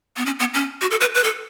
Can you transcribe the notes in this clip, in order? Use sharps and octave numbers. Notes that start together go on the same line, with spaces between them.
B3
C#4
B3
C#4
F#4
A4
B4
B4
A4